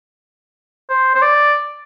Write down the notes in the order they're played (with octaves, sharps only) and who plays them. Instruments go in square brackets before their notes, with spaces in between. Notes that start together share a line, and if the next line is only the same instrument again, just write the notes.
[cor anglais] C5
C5
D5